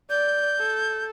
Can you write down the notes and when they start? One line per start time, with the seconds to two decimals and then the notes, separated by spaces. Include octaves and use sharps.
0.10 D5 G6
0.59 A4